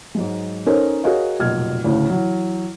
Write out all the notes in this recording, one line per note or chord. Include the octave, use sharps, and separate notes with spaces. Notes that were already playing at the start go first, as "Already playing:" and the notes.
G#2 F#3 G#3
C#4 D#4 A4 A#4 C5 C#5
F#4 G#4 A#4 C#5 D#5 F5
F1 B1 A#2 F6 G#6
D2 A2 C#3
E3 F#3